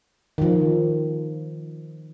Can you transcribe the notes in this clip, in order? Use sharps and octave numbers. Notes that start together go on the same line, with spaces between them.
D#3 F3